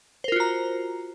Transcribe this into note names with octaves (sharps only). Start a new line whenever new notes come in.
F4 F#4 A#4 C5 A#5